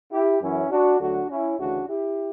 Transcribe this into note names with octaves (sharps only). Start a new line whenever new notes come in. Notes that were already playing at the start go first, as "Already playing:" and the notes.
E4 G4
F#2 E3 C#4 E4
D4 F#4
D2 D3 F#3 D4 F#4
C#4 E4
D2 C#3 E3 D4 F#4
E4 G4